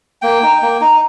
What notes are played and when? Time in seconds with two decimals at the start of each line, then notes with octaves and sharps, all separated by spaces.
0.22 A#3 G5
0.43 D#4
0.62 A#3
0.81 D#4